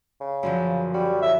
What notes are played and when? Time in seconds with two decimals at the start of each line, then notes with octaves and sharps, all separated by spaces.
0.21 C#3
0.43 F#2 D3 F3
0.94 G3 F#4
1.22 A2 E5